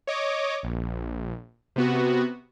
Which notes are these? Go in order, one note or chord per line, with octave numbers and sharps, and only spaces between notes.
C#5 D#5 D6
A#1
C3 B3 F#4